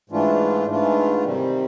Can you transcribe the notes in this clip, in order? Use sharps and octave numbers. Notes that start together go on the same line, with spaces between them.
G#2 E3 A3 D4 F4
G#2 E3 A3 D4 F4
C3 D#3 G3 C4